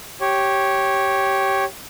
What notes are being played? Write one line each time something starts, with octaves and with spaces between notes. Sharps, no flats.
G4 C#5